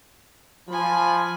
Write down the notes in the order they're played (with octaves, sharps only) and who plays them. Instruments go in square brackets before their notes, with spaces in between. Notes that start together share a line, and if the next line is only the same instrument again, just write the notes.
[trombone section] F3 [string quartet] G#5 B5